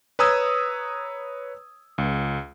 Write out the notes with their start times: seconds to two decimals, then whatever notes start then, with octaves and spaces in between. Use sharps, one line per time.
0.19 B4 C#5 A#5 D#6 E6 G#6
1.98 C#2